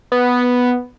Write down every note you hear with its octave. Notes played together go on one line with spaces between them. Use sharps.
B3